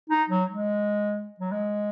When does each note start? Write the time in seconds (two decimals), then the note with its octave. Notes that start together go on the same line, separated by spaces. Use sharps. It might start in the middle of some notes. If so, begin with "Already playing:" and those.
0.10 D#4
0.30 F#3
0.51 G#3
1.40 F#3
1.51 G#3